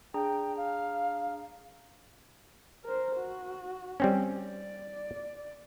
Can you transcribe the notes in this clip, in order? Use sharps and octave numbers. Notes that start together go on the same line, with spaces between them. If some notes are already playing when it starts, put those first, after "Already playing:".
D4 G#4 G5 A#5
F5
A#4 C5
F#4
G3 C4 C#4
D5